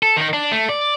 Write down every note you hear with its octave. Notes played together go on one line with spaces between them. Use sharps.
A4
D#3 D#4
D4
A3
D5